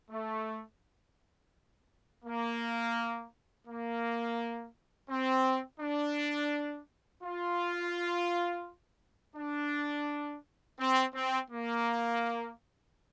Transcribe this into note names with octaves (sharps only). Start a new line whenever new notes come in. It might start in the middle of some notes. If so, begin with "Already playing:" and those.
A3
A#3
A#3
C4
D4
F4
D4
C4
C4
A#3